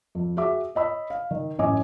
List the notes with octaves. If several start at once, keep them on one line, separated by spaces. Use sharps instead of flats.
F2
F#4 G#4 E5 D6
C#5 D#5 B5 E6
F5
D#3
A1 F#2 C#4 D#5 G#5 D6